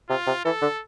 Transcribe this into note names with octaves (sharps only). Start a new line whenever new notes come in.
C3 F4
C3
E3 A4
D3